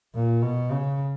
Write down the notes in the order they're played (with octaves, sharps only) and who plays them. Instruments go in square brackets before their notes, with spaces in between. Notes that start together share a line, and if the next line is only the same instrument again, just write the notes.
[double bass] A#2
B2
C#3